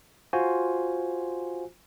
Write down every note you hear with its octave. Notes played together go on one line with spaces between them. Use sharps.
F4 F#4 C5 G#5